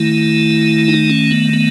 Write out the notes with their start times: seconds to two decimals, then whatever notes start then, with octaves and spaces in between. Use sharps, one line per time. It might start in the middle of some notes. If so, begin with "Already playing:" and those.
Already playing: D#3 A3 E4
0.88 D#4
1.10 C#4
1.31 B3
1.53 B3